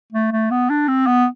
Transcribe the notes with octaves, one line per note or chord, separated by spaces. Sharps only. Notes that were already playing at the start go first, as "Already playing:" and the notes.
A3
A3
B3
D4
C4
B3